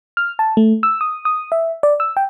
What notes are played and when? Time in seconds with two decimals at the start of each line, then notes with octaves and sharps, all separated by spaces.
0.17 F6
0.39 A5
0.57 A3
0.83 E6
1.01 D#6
1.25 D#6
1.52 E5
1.83 D5
2.00 E6
2.17 G5